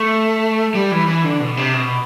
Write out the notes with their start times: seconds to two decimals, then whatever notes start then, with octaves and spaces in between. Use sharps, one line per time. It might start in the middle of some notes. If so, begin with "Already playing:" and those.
Already playing: A3
0.75 G3
0.91 E3
1.07 E3
1.24 D3
1.40 B2
1.57 C3
1.74 B2